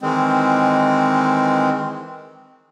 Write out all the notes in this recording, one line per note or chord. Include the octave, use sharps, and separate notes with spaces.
D#3 E3 G#3 C4